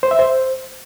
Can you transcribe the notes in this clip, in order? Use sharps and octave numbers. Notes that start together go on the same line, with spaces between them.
C5
E5
C5